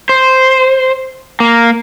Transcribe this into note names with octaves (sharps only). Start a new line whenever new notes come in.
C5
A#3